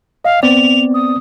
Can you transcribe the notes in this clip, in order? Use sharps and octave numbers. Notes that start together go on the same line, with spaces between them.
D#5 F5
B3 C4 D5 F7
D#6